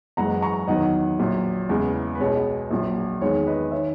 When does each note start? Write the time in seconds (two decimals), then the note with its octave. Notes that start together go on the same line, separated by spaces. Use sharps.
0.17 F#1 F#2 E3 G#3 F#5 A#5
0.42 A#5 C#6
0.67 E2 D#3 F#3 D#5 F#5
1.19 A#1 A#2 F#3
1.69 E2 C#3 E3 G#3
2.15 B4
2.20 C#2 B2 G#3 C#5
2.71 A#1 A#2 F#3
3.21 E2 D#3 G#3 C#5
3.47 B4 D#5
3.72 D#3 C#5 E5